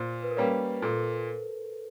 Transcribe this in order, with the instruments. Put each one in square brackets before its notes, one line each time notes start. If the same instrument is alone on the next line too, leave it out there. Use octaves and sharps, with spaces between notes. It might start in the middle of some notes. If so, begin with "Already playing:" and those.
Already playing: [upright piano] A#2 [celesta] C5
[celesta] B4
A#4
[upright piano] G3 A#3 C#4 [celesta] B4
[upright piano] A#2 [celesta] A4